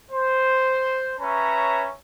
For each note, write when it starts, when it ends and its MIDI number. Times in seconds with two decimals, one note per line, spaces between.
0.11 1.13 72
1.20 1.91 61
1.20 1.91 71
1.20 1.91 73
1.20 1.91 76
1.20 1.91 82